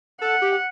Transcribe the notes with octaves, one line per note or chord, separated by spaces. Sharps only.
A4 F#5
G4